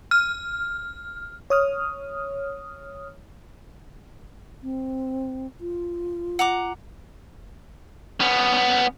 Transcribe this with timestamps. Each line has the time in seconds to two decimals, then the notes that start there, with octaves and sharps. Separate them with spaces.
0.11 F6
1.50 C#5 D#6 F6
4.63 C4
5.61 F4
6.39 F#5 A#5 D6
8.20 B3 C#4